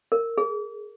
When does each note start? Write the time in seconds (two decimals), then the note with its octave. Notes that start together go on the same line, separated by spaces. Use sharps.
0.12 A#4
0.38 G#4